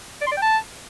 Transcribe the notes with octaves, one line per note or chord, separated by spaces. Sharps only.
D5
C6
D5
G5
A5